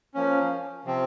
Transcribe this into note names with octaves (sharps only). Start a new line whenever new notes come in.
F3 A#3 C#4
C3 F3 C4